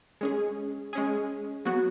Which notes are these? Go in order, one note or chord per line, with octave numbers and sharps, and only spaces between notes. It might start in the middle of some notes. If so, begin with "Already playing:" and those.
G#3 C#4 G#4
G#3 C#4 G#4
F#3 B3 F#4